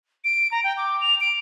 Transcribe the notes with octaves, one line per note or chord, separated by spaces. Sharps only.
D7
A#5
G5
D6
F7
D7